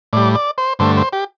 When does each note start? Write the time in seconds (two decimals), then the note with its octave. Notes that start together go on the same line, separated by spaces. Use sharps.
0.13 A2 G3 D5
0.35 D5
0.58 C5
0.79 G2 D3 A3 C5
0.97 C5
1.13 G4